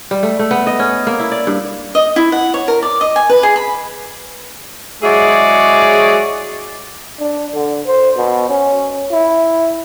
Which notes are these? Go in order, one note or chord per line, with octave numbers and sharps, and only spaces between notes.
G3
A3
A3
B3
D#5
C#4
A#3
E4
D5
G2
D#5
E4
F#5
C#5
A#4
D5
D#5
G#5
B4
G#4
B5
F#3 G#3 E4 G#4 C#5 D5
D4
D3
C5
B2
C#4
E4